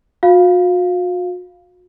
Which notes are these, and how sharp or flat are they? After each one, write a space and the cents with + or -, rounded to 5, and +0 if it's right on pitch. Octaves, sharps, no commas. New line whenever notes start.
F#4 -40 F5 +0